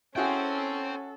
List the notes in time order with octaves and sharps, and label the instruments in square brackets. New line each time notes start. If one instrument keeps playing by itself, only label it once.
[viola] C#4 [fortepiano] E4 F#4 G#4 [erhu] A4 [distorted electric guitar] C5 G5